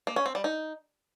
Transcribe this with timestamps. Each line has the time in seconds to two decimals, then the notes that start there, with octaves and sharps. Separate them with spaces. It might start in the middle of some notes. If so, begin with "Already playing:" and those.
0.07 A#3
0.16 C#4
0.26 C4
0.35 G3
0.44 D#4